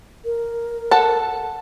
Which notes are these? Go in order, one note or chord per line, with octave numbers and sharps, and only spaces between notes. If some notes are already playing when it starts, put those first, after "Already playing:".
A#4
A4 F#5 A5